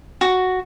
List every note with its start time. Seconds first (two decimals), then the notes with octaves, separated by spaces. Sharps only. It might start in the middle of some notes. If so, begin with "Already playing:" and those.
0.21 F#4